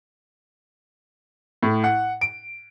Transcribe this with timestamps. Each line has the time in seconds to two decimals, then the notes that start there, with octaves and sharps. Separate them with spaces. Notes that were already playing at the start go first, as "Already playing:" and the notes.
1.63 A2
1.84 F#5
2.21 D7